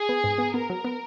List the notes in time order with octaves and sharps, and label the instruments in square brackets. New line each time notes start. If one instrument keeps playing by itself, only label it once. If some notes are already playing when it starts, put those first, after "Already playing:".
Already playing: [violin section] G#4
[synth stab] B3
G#2
B3
[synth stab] B3 [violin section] A#4
[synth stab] F#3
B3